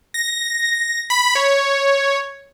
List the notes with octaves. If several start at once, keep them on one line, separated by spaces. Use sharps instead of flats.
A#6
B5
C#5